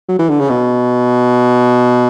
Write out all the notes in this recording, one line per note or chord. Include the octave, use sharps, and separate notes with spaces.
F#3
E3
D3
C#3
B2